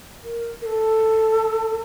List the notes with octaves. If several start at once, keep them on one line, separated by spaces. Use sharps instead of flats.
A#4
A#4
A4